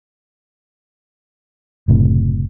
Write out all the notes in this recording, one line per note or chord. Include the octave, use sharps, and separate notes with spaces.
F#1 A2 C3